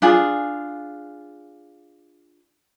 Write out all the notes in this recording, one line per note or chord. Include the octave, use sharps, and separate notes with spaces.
D4 F4 G#4